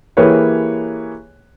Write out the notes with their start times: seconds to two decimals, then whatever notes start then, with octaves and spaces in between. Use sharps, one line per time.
0.17 E3 A#3 G4 G#4 B4 C#5